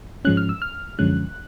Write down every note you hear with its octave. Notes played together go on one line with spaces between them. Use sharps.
G#2 F3 G#3 C#4 F#6
F6
E6
F6
F#2 D3 F3 G#3 C#4 F#6